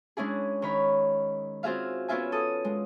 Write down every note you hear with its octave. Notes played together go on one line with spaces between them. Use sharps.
G#3 C#4 D4 E4 G#4
D#3 C#5 B5
C4 F4 F#4 G#4 E5 F5
B3 C#4 E4 F4 E5 G#5
A4 D#6
G#3